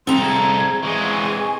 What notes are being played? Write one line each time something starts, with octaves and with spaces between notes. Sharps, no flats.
C2 C4 A4 A#5 C6
G#4 G#6
E3 G#3 G#4 G#5 C#6